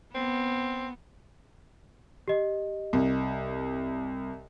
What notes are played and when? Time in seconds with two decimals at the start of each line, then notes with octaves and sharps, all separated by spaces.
0.15 B3 C4
2.28 G4 D#5
2.93 C2